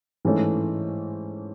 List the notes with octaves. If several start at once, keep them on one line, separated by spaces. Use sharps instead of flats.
G#2 E3 A3 C#4